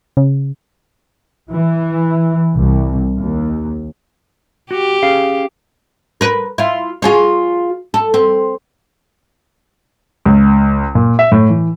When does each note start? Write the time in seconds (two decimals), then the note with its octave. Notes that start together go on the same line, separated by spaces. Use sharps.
0.17 C#3
1.51 E3
2.55 C2
3.18 D#2
4.71 F#4 G4
5.03 C#4 G#4 F5
6.21 A#4 B4
6.58 E4 F4
7.02 F4 G#4 C#5
7.94 A4
8.14 C4
10.26 C#2
10.95 A#2
11.19 E5
11.32 A2
11.49 E3